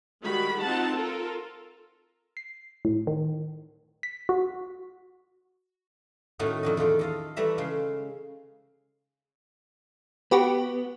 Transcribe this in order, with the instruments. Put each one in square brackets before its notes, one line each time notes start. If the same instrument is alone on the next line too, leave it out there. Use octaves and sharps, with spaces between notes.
[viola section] D#3 G3 G#3 F#4 B5
C4 D#4 F4 F#5 A5
F4 A4 A#4
[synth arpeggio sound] C7
A2
D#3
B6
F#4
[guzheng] A2 D#3 A3 C#4 D#4 F#4
F2 D3 D#5
E2 D#3 F4 D5
A4 D#5 F5
E3 G3 A3 E5 A#5
C#3 G#3 F5
[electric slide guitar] B3 [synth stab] F#4 G4 B4